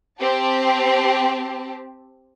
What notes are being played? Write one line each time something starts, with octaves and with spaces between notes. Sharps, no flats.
C4 G4 A5